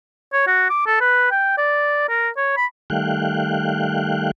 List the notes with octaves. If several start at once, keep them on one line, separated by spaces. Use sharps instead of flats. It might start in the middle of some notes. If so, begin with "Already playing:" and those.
C#5
F#4
D6
A4
B4
G5
D5
A#4
C#5
B5
D#3 G3 A3 F5 G5 F#6